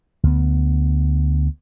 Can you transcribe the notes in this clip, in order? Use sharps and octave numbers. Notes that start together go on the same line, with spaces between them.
D2 B3